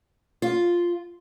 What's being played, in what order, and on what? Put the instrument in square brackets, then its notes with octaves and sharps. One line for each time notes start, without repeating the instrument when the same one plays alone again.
[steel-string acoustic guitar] F4